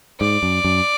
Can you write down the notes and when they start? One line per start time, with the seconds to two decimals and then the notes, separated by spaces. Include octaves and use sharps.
0.20 G#2 D5
0.43 F#2
0.65 F#2